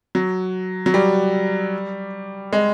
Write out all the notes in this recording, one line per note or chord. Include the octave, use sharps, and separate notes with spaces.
F#3
F#3
G3
G#3